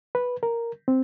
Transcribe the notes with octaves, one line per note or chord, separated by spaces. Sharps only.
B4
A#4
C4